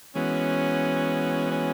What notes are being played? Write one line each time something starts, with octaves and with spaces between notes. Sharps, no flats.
E3 G#3 B3 C#4 F#4
C#4